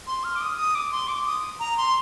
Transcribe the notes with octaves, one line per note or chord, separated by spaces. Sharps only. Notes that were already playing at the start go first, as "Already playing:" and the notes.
C6
F6
D6
D#6
D#6
D6
C6
D6
D#6
A#5
C6